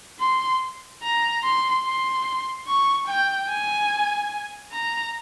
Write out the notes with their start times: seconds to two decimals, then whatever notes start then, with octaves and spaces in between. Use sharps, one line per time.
0.20 C6
1.03 A#5
1.44 C6
1.84 C6
2.67 C#6
3.08 G5
3.50 G#5
4.73 A#5